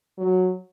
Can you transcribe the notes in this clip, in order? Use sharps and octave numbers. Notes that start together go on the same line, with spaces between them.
F#3